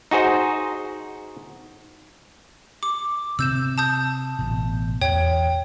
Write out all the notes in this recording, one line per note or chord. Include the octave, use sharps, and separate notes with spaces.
D#4 F#4 G#4 C5
D6
C3 C4 E6 G6 E7
A5 D#6 G6
A1 B2
E2 C#5 G5